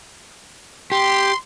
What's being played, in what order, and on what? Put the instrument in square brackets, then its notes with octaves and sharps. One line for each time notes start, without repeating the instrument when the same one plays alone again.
[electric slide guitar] G4 [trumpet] C6